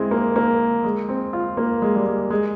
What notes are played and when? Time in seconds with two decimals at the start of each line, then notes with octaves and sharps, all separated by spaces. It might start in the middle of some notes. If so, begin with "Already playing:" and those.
Already playing: G#3 C4 E4
0.11 A#3
0.36 A#3
0.84 G#3
1.09 C4
1.33 F4
1.57 A#3
1.82 G#3
1.95 G3
2.06 G#3
2.30 G#3